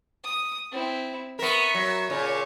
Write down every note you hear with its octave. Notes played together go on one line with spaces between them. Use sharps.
D#6
C4 E4
B3 A#4 E5 C#6
F#3
A#2 C#3 C#5